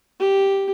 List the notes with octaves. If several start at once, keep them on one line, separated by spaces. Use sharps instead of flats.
G4